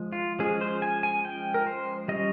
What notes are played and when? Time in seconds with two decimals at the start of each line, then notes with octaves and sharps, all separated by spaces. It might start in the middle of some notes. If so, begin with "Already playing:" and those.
Already playing: F3 G#3
0.13 F4
0.39 F3 G#3 C#4 G#4
0.61 C5
0.82 G#5
1.03 G#5
1.25 G5
1.54 A#4
1.67 C5
2.08 G3 C#4 D#5